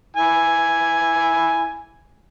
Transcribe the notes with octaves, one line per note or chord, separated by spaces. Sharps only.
E4 G#5